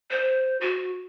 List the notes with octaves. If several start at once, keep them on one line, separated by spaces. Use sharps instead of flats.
C5
F#4